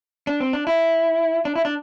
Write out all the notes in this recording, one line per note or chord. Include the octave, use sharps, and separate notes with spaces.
D4
C4
D4
E4
D4
E4
D4